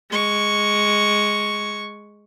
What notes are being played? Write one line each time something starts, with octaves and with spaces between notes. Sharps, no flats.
G#3 C#6